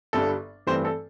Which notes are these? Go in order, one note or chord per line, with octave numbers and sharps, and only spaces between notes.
G1 G2 G3 D4 A4
G2 E3 A3 C4 C5
A4